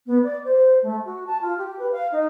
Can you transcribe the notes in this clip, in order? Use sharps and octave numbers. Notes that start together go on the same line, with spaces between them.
B3
D5
C5
A3
F#4
A5
F4
G4
B4
F5
D#4